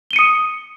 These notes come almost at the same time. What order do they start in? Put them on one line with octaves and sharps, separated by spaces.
G7 D#7 C#7 D#6